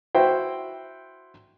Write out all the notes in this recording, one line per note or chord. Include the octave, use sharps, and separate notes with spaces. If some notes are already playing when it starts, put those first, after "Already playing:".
E4 F#4 C5 G5